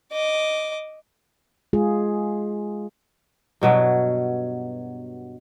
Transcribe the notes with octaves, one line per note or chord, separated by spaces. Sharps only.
D#5 D6
G#3 F4 G#4
G2 B2 F#3 F#5